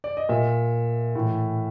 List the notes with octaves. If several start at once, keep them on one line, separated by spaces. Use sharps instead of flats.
D5
D#5
A#2 E5
A2 E3